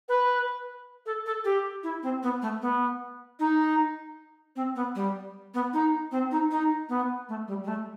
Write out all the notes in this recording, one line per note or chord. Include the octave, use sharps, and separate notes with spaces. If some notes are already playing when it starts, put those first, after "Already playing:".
B4
A4
A4
G4
E4
C4
B3
A3
B3
D#4
C4
B3
G3
B3
D#4
C4
D#4
D#4
B3
A3
G3
G3
A3